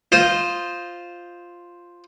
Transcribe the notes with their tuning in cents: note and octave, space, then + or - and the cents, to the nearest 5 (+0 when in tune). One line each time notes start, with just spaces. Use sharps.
F4 +0 C5 +0 D#5 +0